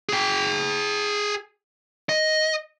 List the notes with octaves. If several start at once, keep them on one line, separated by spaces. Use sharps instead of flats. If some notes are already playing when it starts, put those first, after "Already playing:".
G#4 G5
D#5